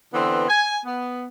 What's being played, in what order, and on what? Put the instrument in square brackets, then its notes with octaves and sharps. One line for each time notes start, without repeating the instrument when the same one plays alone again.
[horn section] D3 E3 B3 C4
G#5
B3